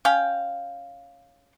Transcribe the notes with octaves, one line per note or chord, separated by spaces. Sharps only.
C#4 F5 G5